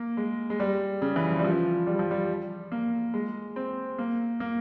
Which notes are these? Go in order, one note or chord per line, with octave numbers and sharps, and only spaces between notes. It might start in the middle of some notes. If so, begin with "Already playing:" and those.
Already playing: A#3
G#3
G#3
G3
C#3
E3
F3
G3
F3
G3
F3
G3
A#3
G#3
C4
A#3
A#3